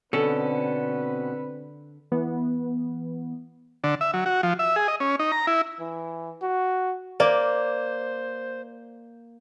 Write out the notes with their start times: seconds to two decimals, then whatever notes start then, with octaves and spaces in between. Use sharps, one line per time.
0.13 B2 D3 C4 C#4 A4 B4
2.12 E3 B3
3.84 D3
4.01 E5
4.14 F#3
4.26 F#4
4.43 F3
4.59 E5
4.76 G#4
4.88 D#5
5.00 C#4
5.19 D#4
5.32 A#5
5.47 E4
5.80 E3
6.42 F#4
7.20 A#3 C5 D5